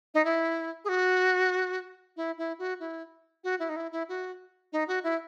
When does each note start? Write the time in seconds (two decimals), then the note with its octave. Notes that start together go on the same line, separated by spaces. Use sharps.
0.14 D#4
0.25 E4
0.85 G#4
0.89 F#4
2.17 E4
2.38 E4
2.59 F#4
2.80 E4
3.44 F#4
3.60 E4
3.69 D#4
3.76 E4
3.92 E4
4.09 F#4
4.73 D#4
4.88 F#4
5.04 E4